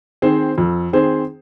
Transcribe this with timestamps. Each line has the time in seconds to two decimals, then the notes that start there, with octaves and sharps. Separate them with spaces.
0.22 D#3 C4 G#4 C5
0.58 F2
0.93 D#3 C4 G#4 C5